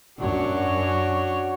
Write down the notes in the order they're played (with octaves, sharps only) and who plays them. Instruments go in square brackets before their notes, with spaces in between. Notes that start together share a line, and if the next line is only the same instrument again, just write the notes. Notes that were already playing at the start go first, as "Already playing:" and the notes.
[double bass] F#2 [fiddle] D4 C#5 [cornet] F#4